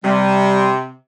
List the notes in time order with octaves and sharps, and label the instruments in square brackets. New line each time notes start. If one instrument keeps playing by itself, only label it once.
[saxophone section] C3 [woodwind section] G3